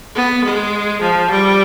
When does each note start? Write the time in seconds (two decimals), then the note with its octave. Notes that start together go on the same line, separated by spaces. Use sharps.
0.16 B3
0.44 G#3
1.01 F3
1.30 G3